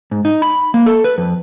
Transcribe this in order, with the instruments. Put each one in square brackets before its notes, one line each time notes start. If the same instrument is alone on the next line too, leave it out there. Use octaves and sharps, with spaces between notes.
[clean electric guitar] G#2
D#4
B5
A#3
A4
B4
F2